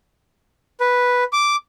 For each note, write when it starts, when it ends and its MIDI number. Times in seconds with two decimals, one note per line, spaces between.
0.80 1.24 71
1.33 1.56 86